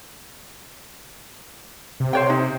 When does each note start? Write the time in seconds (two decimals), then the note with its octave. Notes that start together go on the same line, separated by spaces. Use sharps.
2.00 C3
2.13 C5 C#5 G5
2.30 D#4